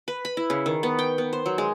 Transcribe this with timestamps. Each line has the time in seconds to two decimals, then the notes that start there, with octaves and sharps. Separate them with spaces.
0.08 B4
0.25 B5
0.37 E4
0.50 C#3
0.66 D#3
0.83 B3
0.99 G5
1.18 B3
1.33 C5
1.46 F#3
1.58 G#3